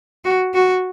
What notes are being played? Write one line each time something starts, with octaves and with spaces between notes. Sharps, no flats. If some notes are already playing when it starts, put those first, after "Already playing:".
F#4
F#4